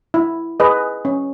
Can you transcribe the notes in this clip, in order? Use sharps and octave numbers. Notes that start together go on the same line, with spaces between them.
E4
G#4 B4 D#5
C#4